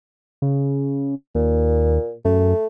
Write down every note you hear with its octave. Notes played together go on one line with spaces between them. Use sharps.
C#3
D#2 A#2
F#2 A3